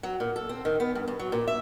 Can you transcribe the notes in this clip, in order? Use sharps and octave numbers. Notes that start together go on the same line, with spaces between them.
F#3
A#2
A4
C4
D#3
B3
G2
G2
F#3
A#2
E5